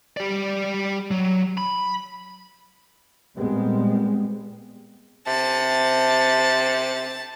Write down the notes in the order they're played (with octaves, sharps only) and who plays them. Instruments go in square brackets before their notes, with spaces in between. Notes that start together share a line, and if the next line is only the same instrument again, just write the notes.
[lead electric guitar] G3 D5
F#3
B5
[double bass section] A#2 G3 G#3 B3 C4
[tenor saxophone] C3 [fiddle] A5